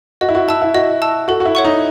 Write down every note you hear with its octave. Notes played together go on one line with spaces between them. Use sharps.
F#4 D#5
E4
F#4
E4 A5 E6
E4
F#4 D#5
A5 E6
F#4 A4
F#4
E4
C#5 F#5 C#6
D#4